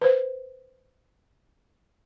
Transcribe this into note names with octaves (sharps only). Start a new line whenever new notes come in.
B4 C5